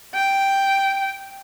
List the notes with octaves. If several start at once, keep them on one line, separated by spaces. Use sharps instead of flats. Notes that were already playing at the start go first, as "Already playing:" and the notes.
G5